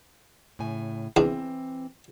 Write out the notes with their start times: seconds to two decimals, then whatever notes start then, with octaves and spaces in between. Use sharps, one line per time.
0.59 A2 C#3 G#5
1.16 E2 E3 C4 D4